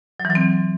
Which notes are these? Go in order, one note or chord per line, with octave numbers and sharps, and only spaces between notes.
F#3
E3
F#3
C4